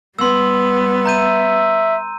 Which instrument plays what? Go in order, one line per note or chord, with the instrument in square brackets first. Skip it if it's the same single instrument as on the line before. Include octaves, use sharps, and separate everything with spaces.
[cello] G3 B3 [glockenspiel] C6 E6
[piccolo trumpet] E5 [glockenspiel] A#5 G6 D#7